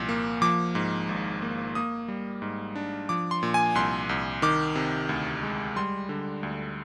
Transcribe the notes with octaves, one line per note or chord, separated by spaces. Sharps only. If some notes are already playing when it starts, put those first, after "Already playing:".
Already playing: C2 A#2 F3
A#3
F3 D6
G#2
G#1
A#3
A#3 D#6
G3
G#2
D4
F3 D6
C6
A#2
G#5
C2 C6
C2
D#3 D6
C3
D2
G#3
G3 C6
D3
D2